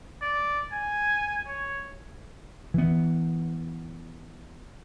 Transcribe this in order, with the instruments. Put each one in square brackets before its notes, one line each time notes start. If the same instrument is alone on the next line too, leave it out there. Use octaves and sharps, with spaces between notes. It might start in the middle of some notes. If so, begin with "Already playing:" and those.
[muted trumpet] D5
G#5
C#5
[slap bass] E3 B3